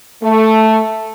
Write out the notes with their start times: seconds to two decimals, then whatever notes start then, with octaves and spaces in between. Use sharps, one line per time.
0.23 A3